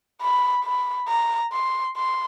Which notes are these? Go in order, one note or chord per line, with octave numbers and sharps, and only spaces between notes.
B5
B5
A#5
C6
C6